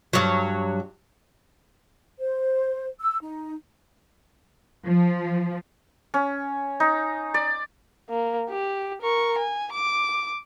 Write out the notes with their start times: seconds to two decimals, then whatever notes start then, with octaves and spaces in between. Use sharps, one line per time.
0.13 G2 F#3
2.19 C5
3.00 E6
3.22 D#4
4.86 F3
6.14 C#4
6.80 D#4
7.34 D5
8.09 A#3
8.50 G4
9.02 A#4 C#6
9.38 G#5
9.72 D6